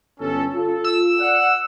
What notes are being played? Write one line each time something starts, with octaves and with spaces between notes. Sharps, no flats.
G1 C#4 A4
F4 A4
E6
D5 F#5